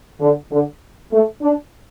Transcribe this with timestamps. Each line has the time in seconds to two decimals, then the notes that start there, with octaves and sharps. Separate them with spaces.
0.21 D3
0.52 D3
1.12 A3
1.42 D4